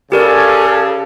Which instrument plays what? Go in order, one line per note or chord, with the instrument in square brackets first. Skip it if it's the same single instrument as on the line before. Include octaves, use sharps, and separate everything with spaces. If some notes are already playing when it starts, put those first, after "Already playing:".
[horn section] C#3 [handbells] G4 A#4 D5 [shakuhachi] A4